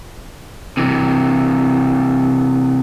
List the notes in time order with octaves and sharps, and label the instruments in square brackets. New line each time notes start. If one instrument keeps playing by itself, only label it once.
[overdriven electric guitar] C3 E3